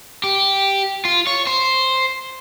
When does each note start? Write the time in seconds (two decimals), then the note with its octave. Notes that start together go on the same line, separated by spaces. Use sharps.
0.24 G4
1.05 F4
1.27 C#5
1.47 C5